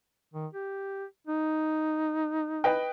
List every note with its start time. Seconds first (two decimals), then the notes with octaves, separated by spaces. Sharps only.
0.34 D#3
0.54 G4
1.27 D#4
2.64 B4 D#5 G5